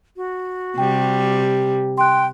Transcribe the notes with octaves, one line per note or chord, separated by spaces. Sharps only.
F#4
C3 G3 G5
G5 C6 F#6